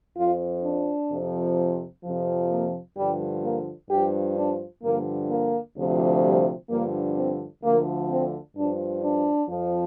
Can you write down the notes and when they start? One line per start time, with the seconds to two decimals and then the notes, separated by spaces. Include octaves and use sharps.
0.18 F2 F3 F4
0.65 D4
1.11 F2 C3 F3
2.04 F2 C3 F3
2.51 A#3
2.98 G2 D3 F3 G3
3.44 A#3
3.90 G2 F3 G4
4.38 D4
4.84 G2 D3 F3 A#3
5.31 A#3
5.77 D2 C3 F3
6.23 G3
6.70 G2 D3 F3 A#3
7.17 C4
7.63 D2 D3 F3 A#3
8.10 C4
8.56 G2 F3 D4
9.04 D4
9.50 F2 F3